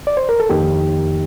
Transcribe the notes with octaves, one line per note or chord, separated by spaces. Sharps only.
D5
C5
A#4
A4
F2 D#3 A#3 D#4 G4